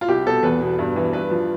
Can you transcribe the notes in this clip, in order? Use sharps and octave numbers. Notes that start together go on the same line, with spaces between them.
F4
C2 G4
B2 A4
E2 B4
B2
G2
E3
G2 B4
F3